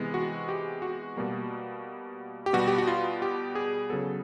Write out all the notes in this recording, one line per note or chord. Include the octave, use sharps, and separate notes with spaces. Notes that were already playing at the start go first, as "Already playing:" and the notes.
Already playing: C3 E3 G#3 B3
F#4
G4
F#4
B2 G3 A#3
G4
B2 G3 B3 F#4
G4
F#4
F4
G4
G#4
C#3 F#3 B3 A4